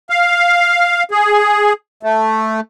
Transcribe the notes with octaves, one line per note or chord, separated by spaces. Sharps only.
F5
G#4
A3